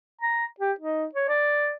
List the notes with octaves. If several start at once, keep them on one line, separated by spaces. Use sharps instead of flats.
A#5
G4
D#4
C#5
D5